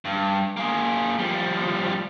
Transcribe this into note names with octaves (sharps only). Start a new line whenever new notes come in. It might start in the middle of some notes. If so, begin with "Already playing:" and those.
G2
A#3 G#4
F3 G3